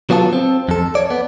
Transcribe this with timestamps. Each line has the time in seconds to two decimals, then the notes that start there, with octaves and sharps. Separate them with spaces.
0.10 F#3 B3 F4 G4 A4
0.33 C4
0.69 F2 A4
0.95 C#5 D5
1.10 B3